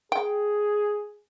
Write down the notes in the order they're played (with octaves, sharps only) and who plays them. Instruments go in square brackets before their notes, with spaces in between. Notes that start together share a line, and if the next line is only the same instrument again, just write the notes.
[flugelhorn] G#4 [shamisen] G5